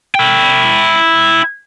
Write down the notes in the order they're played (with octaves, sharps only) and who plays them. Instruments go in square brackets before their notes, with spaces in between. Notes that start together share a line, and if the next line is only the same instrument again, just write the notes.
[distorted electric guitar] E4 G5